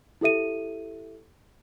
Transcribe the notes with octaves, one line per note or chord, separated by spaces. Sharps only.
E4 G4 A4 E5 D#7